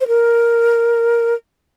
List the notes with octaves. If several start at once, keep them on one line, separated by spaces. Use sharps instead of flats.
C5
A#4